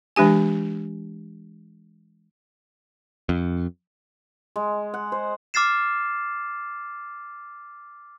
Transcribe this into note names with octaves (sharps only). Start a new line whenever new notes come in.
E3 G#3 D4 G4 G#5
F2
G#3
F#5
C5
D6 F6 A6 C7 E7